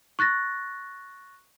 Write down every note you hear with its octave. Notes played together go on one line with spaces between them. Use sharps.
C#6 F#6 A6 A#6